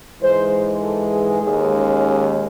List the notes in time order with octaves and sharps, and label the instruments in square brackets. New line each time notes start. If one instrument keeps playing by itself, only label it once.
[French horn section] G#2 E3 G#3 C5
A4
G#4
D#2 D#3 G#3
C#4